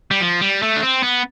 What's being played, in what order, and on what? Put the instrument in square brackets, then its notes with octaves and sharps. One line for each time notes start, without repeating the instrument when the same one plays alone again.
[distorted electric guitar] G3
F3
G3
A3
D4
C4
B3